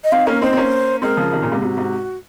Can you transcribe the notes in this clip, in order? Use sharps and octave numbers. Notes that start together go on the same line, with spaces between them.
D#5
C4 D#4 F5
A#3 C#4 A#4
C4 D#4 C5
C4
A#3 C#4
G#3 C4 A#4
C#3 F3
C3 D#3
A#2 C#3
G#2 C3
G#2 C3 F#4
G#2 C3